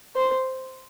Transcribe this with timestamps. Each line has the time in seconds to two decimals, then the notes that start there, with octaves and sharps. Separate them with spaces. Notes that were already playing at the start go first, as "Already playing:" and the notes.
0.16 C5